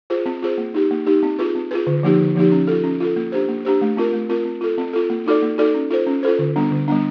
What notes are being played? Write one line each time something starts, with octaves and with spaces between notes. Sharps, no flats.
F4 G#4 C5
C4
F4 G#4 C5
A#3
D#4 G4
A#3
D#4 G4
C4
F4 G#4 B4
C4
F4 G#4 B4
D3
F3 A#3 D#4 G4
D3
F3 A#3 D#4 G4
C#4
F4 A4
C#4
F4 A4
A#3
D4 G4 C5
A#3
D4 G4 C5
A3
C4 F4 A#4
A3
C4 F4 A#4
C4
F4 A4
C4
F4 A4
A#3
D#4 F#4 A4 D5
A#3
D#4 F#4 A4 D5
C#4
F4 A4 C5
C#4
F4 A4 C5
D3
G3 B3 D4
D3
G3 B3 D4